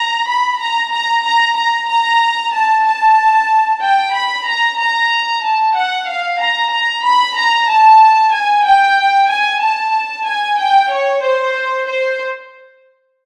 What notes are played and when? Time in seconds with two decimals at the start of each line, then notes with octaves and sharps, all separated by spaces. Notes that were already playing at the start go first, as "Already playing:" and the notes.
Already playing: A#5
0.27 B5
0.59 A#5
0.91 A#5
1.24 A#5
1.56 A#5
1.88 A#5
2.52 A5
2.85 A5
3.81 G5
4.13 B5
4.47 A#5
4.78 A#5
5.43 A5
5.75 F#5
6.07 F5
6.40 A#5
6.72 A#5
7.04 B5
7.36 A#5
7.69 A5
8.32 G#5
8.65 G5
9.29 G#5
9.61 A5
10.27 G#5
10.59 G5
10.91 C#5
11.22 C5
11.87 C5